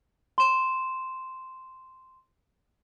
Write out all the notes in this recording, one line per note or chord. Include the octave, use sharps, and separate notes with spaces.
C6 E7